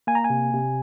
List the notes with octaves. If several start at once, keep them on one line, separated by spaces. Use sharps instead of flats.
A#3 G#5
A#5
G#5
C3
C3